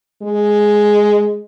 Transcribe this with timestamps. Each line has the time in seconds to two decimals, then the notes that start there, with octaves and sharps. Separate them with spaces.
0.23 G#3